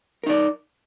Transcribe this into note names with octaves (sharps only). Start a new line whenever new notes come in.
D#4 A#4 D5